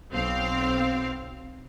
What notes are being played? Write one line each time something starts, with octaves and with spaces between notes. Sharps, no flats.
B1 C4 F5